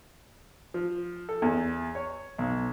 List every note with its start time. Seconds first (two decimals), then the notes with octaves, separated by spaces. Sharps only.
0.74 F3
1.29 A4
1.42 E2
1.95 C#5
2.38 B1